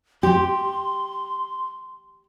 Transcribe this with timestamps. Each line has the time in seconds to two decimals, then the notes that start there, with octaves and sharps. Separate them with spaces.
0.23 G4 C6